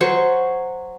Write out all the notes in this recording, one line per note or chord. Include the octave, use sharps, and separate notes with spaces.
F#3 C5 C#6